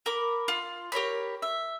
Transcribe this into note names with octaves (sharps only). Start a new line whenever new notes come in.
A#4 B5 D6
F4 C6
G4 A#4 C#5 B5
E5